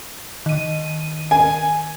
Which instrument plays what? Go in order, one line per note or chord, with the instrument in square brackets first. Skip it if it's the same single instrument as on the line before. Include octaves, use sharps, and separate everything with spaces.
[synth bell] D#3 D#7
[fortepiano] G#5